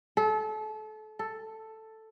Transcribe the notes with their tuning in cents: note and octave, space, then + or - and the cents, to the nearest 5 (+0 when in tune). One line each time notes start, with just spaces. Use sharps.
A4 -30
A4 +5